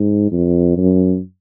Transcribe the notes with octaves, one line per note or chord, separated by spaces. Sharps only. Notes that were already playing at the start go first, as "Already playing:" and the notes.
Already playing: G#2
F2
F#2